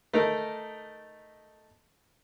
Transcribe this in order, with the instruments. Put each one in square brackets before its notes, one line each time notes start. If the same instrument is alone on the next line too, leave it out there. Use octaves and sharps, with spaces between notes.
[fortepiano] A3 D#4 A#4